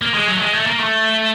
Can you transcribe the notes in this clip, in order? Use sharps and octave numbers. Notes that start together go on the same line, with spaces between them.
A#3
G#3
F#3
A3
G#3
A3
A#3
A3